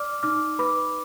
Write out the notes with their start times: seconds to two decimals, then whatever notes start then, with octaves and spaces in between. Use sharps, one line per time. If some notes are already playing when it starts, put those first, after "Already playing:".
Already playing: D5 D6 F6
0.23 D#4 D6 F6
0.59 B4 B5 D6